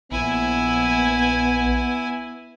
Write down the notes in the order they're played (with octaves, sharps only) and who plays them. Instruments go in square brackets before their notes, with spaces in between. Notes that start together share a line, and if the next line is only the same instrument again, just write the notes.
[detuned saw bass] A#1 [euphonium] B3 [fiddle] E4 G#5